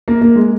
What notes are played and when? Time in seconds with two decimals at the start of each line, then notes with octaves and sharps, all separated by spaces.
0.08 A#3
0.21 A#3
0.36 G#3